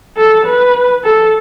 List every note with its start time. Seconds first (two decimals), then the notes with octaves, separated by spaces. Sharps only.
0.17 A4
0.46 B4
1.04 A4